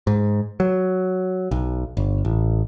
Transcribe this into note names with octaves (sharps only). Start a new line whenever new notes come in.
G#2
F#3
B1
G1
A1